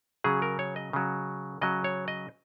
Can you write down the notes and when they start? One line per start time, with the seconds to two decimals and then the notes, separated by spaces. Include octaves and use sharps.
0.24 C#3 F#3 G#4
0.42 A#4
0.59 C#5
0.76 D#5
0.93 C#3 F#3
1.61 C#3 F#3 D#5
1.84 C#5
2.08 D#5